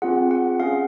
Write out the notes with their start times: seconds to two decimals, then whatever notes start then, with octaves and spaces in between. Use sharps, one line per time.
0.02 C4 F4 G#4 F#5
0.31 F#5
0.60 C#4 G#4 F5